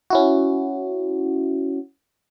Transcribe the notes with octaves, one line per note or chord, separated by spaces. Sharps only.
C#4 E4 F#4